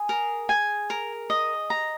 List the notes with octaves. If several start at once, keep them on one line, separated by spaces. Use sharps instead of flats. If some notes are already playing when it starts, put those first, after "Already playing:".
Already playing: G#4
A#4
G#5
A#4
D#5
A#5